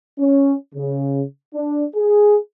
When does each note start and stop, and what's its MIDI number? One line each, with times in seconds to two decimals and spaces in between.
0.18 0.53 61
0.75 1.22 49
1.53 1.84 62
1.95 2.37 68